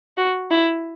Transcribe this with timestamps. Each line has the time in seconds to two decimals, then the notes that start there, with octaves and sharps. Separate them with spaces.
0.17 F#4
0.51 E4